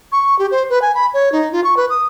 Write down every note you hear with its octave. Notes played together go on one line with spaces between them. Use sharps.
C#6
G4
C5
B4
G#5
B5
C#5
D#4
F4
C#6
B4
D#6